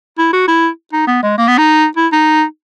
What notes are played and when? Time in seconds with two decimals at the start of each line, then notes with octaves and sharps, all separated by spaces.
0.18 E4
0.33 F#4
0.48 E4
0.93 D#4
1.08 B3
1.23 G#3
1.38 A#3
1.48 B3
1.58 D#4
1.97 E4
2.12 D#4